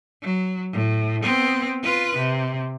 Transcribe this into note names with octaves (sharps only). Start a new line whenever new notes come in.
F#3
A2
B3 C4
F4 B4
C3